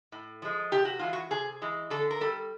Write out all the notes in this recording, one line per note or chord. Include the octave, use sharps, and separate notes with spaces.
A2
F3 G#3
C3 G4
F#4
E3 G#3 F4
F#4
C3 G#4
E3 G#3
D3 A4
A#4
G3 A4